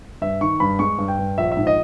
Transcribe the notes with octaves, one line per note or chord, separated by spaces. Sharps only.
G2 E5
D#3 C#6
G2 B5
G#3 C#6
G2
G5
G2
A#1 E5
E5
G#2
D#5